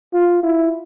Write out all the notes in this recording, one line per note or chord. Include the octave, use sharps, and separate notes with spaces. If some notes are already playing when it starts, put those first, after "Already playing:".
F4
E4